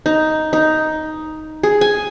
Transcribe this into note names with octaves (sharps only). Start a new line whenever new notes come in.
D#4
D#4
G#4
G#5